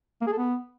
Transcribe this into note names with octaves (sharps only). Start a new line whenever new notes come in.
A#3
G#4
A4
B3